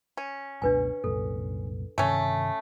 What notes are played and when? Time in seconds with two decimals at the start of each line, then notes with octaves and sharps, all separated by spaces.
0.17 C#4
0.62 F#1 C#2 B2 D4 B4 G#5
1.04 C2 F#2 A#2 A4
1.98 G2 C3 D#3 A3 C#4